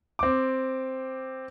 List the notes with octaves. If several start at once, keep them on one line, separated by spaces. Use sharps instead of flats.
C4 D6